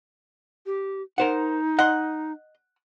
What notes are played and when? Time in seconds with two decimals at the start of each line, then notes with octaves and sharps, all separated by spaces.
0.66 G4
1.18 D#4 A#4 C5 F#5
1.79 D#5 F#5 C6